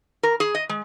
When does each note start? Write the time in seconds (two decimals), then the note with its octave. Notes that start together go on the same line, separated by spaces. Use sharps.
0.23 A#4
0.40 G#4
0.55 D#5
0.69 G#3